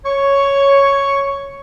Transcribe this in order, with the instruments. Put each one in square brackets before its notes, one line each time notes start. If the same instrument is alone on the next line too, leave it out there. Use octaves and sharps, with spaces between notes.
[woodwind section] C#5 [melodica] C#6